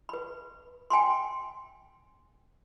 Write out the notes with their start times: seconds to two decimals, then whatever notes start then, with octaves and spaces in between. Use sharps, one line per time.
0.09 B4 B5
0.90 G5 G#5 B5 C6